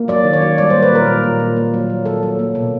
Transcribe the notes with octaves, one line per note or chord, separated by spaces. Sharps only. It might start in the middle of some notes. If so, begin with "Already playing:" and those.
Already playing: A#3
F#3 D5
D#3
C#5
F#3
G3 D5
C5
A#3
B4
A#2 A#4
A#2
A#2
A#2
A#3
F#3
F#3
F#3 A4
F#3
A#3
B2